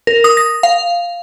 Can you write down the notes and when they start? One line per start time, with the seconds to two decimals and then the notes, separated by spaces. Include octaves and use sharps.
0.07 A#4
0.24 D#6
0.37 A#6
0.63 F5